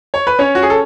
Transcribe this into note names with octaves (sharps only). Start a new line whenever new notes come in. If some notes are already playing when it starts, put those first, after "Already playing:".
C#5
B4
C#4 C#5
F#4
G#4
A4